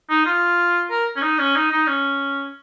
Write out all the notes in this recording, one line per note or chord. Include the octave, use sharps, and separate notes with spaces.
D#4
F4
A#4
C#4
D#4
C#4
D#4
D#4
C#4